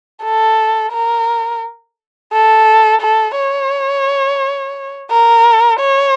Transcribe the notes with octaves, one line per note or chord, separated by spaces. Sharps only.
A4
A#4
A4
A4
C#5
A#4
C#5